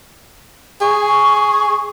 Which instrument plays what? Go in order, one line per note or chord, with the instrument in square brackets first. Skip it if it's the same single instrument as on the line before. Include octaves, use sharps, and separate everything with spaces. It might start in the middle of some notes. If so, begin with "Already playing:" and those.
[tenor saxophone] G#4 [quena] C#6